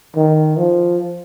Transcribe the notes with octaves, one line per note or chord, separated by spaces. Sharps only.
D#3
F3